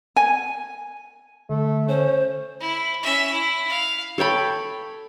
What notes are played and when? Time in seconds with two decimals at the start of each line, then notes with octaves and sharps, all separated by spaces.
0.16 G#5
1.50 D3 A3
1.88 C#4 C5
2.60 E4
3.03 C#4 E5
3.32 E4
3.69 F5
4.18 A4 C#5 G5 B5